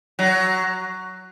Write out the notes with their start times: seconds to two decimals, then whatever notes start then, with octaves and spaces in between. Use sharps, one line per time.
0.19 F#3